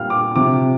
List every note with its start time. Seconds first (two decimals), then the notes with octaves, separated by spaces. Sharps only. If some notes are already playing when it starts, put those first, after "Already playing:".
Already playing: A#2 G3 F5 F6
0.10 D6
0.35 C3 F3 D6